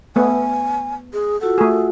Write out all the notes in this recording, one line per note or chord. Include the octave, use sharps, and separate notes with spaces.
A3 B3 G#5
G#4
F4 F#4 A4 F#5
A3 G#4